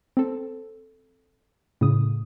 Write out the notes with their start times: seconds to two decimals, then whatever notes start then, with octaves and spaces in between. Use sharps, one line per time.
0.17 C4 A4
1.81 A2 C#3 D#6